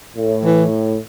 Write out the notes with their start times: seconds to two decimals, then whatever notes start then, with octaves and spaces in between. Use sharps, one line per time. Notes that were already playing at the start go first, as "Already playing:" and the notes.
0.16 A2
0.45 E3